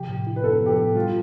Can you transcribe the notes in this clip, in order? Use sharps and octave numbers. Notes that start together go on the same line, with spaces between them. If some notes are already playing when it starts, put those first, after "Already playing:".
Already playing: C3 F3 G4
A2
E4
B4
B3 A4
F3 G4
A4
A2
G3 F4